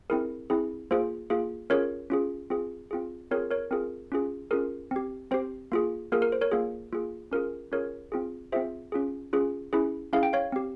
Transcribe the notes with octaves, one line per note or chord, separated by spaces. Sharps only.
C4 E4 G#4 A#4
C4 E4 G#4
A#3 F4 G#4 C5
A#3 F4 G#4
C#4 F4 G#4 A#4 C#5
C#4 F4 G#4
C4 F4 G#4
C4 F4 G#4
C4 F4 G#4 A#4 C#5
A#4 C#5
C4 F4 G#4 A#4
C#4 F4 G#4
C#4 F4 G#4 A#4
C4 G4
C4 G4 C5
A#3 F4 G#4
A#3 F4 G#4 A#4
A#4
C5
A#4 C#5
A#3 F4 G#4
A#3 F4 G#4
C#4 F4 G#4 A#4
C#4 F4 G#4 A#4 C#5
C4 F4 G#4
C4 F4 G#4 C5 E5
C#4 F4 G#4
C#4 F4 G#4
C#4 E4 G#4
C#4 E4 G#4 F5
G5
C#5 F5
C4 G4